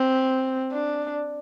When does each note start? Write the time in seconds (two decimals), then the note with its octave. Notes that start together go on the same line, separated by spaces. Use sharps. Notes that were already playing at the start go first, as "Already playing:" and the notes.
Already playing: C4
0.72 D4